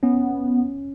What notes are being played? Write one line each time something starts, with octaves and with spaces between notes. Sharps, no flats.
B3 C#4